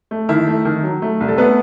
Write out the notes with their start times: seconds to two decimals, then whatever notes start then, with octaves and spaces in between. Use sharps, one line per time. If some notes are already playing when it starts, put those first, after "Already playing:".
0.11 A3
0.29 D#3 E4 E5
0.47 A3
0.65 D#3
0.83 F#3
1.02 A3
1.20 C2
1.28 A4
1.38 A3 B3 B4